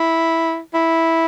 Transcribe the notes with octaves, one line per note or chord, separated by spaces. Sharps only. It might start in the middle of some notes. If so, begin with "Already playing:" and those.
Already playing: E4
E4